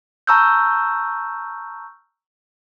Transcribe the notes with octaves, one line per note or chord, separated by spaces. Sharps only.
A5 A#5 C#6 E6 F6 G6